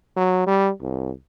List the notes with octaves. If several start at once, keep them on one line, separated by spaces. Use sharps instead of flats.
F#3
G3
C2